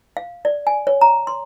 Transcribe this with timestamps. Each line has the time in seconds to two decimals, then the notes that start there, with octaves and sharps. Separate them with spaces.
0.17 F5
0.45 D5
0.67 G#5
0.87 C#5
1.01 A#5
1.27 C6